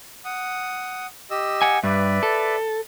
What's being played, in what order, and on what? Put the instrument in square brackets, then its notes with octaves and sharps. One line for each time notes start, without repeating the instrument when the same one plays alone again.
[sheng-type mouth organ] F#5 D#6
G4 D#5 E6
[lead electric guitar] F#5 G#5
[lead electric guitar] G2 [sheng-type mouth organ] B4 D5 E5
[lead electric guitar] A4